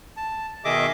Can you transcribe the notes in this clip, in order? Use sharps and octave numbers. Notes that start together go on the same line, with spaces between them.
A5
B2 D#3 G#4 D#5 E5 D6